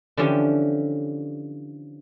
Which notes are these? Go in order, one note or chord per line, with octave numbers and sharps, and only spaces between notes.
D3 E3 F3 C#4 G4 E5